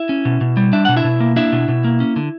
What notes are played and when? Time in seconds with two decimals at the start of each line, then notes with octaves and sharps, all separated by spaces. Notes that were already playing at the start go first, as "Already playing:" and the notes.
Already playing: E4 E5
0.09 C#4
0.25 B2
0.41 B2
0.57 G3
0.73 D4 E5
0.85 B2 F#5
0.97 E4 E5
1.04 B2
1.20 A#3
1.36 D4 E4 E5
1.52 B2
1.68 B2
1.84 A#3
2.00 C#4
2.16 D3